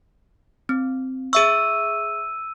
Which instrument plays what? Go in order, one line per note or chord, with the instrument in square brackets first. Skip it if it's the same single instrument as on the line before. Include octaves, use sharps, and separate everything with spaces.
[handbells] C4
[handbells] G#4 E5 C#6 [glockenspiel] E6 D#7